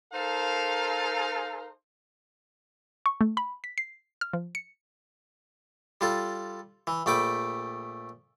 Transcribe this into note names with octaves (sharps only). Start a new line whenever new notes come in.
D#4 A4 A#4 C5 F5
C#6
A3
B5
B6
C7
F6
F3
C#7
G3 F4 A4
E3
A#1 A3 G5 B5 D6